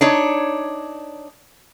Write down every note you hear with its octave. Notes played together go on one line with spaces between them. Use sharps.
D4 D#4 C#5